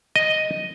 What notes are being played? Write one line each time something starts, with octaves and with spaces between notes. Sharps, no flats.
D#5